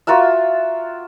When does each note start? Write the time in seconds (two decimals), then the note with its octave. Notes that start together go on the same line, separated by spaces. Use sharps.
0.07 F4 F#4 A#4 E5